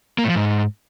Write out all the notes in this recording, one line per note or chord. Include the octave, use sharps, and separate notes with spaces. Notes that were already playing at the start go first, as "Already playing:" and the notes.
A#3
A2
F3
G#2